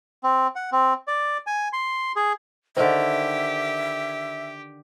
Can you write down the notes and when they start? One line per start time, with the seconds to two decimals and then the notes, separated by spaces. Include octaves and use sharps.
0.24 C4
0.56 F#5
0.72 C4
1.08 D5
1.47 G#5
1.73 C6
2.16 G#4
2.77 D3 D#3 G4 C5 E5